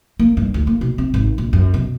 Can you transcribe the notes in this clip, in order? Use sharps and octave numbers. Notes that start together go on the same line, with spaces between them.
A#3
G2
D2
A#3
B2
C4
G#1
A#1
F#2
B2